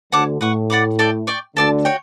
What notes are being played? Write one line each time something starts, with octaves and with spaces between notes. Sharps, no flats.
D2 D3 C#5 F#5 A5 D6
A2 B4 F#5 C#6
D5 F#5 B5 D6
A4 D5 G5
D5 G5 C#6
D2 D3 A4 D5 A5
F#4 C#5 G5